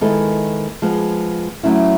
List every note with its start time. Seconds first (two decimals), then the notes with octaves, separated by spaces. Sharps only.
0.01 D#3 G#3 B3 E4 A4
0.82 F3 G#3 B3
1.63 F#3 A3 C#4 E4